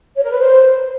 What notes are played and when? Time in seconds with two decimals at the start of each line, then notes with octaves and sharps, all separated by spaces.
0.16 C#5
0.24 A#4
0.32 B4
0.39 C5